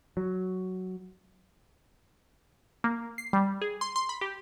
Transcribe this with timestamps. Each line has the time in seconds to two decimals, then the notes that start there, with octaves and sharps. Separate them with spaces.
0.17 F#3
2.84 A#3
3.18 C7
3.33 G3
3.62 G#4
3.81 C6
3.96 C6
4.09 B5
4.21 G4